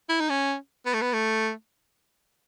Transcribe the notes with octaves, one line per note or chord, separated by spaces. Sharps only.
E4
D#4
C#4
B3
A3
B3
A3